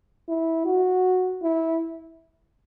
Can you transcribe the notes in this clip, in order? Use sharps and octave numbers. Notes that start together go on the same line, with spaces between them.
E4
F#4
E4